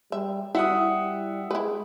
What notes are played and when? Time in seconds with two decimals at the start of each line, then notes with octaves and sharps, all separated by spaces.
0.12 G3 E5
0.55 G3 E4 F#4 E5 F#5 D#6
1.51 G#3 E4 G4 B4